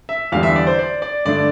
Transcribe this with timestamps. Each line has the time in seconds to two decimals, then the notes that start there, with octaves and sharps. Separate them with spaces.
0.09 E5
0.32 E2 D3 G3 D4 F5
0.43 E5
0.56 D5
0.67 C5
0.79 D5
1.02 D5
1.25 G2 D3 A3 D4 D5